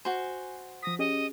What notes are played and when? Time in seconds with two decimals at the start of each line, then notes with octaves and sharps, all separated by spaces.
0.05 F#4 C5 G#5
0.83 F3 D#6 A#6 B6
0.99 C#4 G4 G#4 D#5